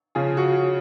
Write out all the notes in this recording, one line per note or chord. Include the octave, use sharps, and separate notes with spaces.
C#3 F3 G#4
F#4